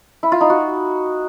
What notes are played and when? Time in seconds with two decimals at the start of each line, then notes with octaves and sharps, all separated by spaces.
0.23 E4
0.32 F4
0.41 D#4
0.50 F#4